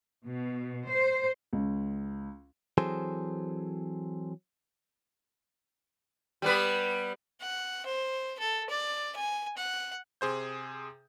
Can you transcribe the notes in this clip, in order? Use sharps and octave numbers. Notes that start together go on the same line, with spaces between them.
B2
C5
C#2
E3 F#3 C4 G#4 A4 C5
G3 B3 B4
F#5
C5
A4
D5
G#5
F#5
C3 G#4 C5 G6